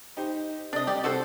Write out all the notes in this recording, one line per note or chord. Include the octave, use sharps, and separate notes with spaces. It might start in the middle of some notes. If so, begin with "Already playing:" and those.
D#4 G4 C5
C3 D4 D#5
G3 G4 D5
C3 F#4 A4 C5